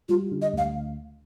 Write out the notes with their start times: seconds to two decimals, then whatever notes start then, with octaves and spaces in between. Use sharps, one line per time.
0.09 G3 F4
0.31 D3
0.42 D#5
0.53 D2
0.58 F5